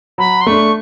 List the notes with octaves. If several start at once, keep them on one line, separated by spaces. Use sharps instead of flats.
F#3 B5
C6
A3 D4 C#6